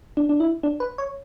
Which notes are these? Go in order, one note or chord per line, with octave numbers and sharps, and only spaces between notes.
D4
D4
E4
D4
B4
C#5